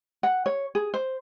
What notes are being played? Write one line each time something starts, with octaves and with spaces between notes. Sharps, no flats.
F#5
C#5
G#4
C5